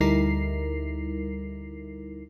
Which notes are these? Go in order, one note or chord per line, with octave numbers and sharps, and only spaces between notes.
D2 G3 D#4 E4 A#4 C7